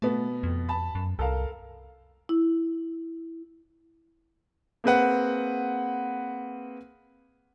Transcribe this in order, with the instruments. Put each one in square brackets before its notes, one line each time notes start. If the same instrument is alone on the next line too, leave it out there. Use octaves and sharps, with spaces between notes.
[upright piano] B2 B3 [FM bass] A3
[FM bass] F2
[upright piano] A5 B5
[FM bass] F#2
[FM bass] C2 [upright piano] A4 A#4 F5
[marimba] E4
[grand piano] A#3 C4 G#4 B4 F#5